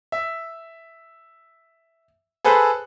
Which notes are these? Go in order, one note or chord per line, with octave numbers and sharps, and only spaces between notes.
E5
G#4 A4 B4 C5 F#6